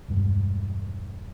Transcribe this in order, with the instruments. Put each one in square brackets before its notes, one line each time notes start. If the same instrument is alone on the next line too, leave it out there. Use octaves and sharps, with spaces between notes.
[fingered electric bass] E1 G2 G#3